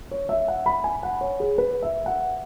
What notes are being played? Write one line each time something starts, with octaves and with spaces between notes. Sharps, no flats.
C#5
E5
F#5
B5
G#5
F#5
C#5
G#4
B4
E5
F#5